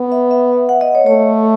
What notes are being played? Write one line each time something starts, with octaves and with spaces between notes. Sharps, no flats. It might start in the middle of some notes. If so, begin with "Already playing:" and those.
Already playing: B3
E5
E5
F#5
D#5
C#5
A3 C#5